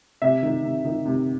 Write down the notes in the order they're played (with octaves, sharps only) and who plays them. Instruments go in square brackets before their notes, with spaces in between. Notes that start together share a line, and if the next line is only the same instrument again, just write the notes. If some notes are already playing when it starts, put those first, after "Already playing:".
[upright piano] C3 E5
D#3
C3
D#3
C3